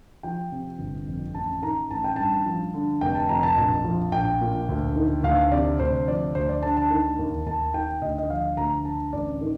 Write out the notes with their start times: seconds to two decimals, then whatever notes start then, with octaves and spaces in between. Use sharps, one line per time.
0.23 F3 G5
0.52 C3
0.79 G1
1.07 F2
1.35 A1 A5
1.62 D#3 A#5
1.91 A1 A5
2.04 G5
2.16 G2 A5
2.46 F3
2.74 D3
3.01 F1 G5
3.15 A5
3.29 F2 A#5
3.43 A5
3.58 A#1
3.85 F3
4.12 A#1 G5
4.41 A#2
4.69 D2
4.96 D#3
5.23 D2 F5
5.52 C3 D5
5.80 D2 C5
6.08 F3 D5
6.35 D2 C5
6.49 D5
6.63 D3 A5
6.77 A5
6.90 D#3
7.19 D#2
7.46 D#2 A5
7.74 D#3 G5
8.02 D2 D#5
8.18 D#5
8.30 F3 F5
8.57 D2 A#5
8.85 D3 A5
9.13 A1 D5
9.41 D#3